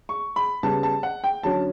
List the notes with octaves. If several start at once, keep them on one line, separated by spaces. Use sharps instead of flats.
C#6
B5
C#3 G3 B3 A5
A5
F#5
G5
D3 F#3 C#4 A5